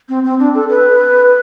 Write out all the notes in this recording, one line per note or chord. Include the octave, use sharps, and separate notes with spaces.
C4
C4
D4
A4
B4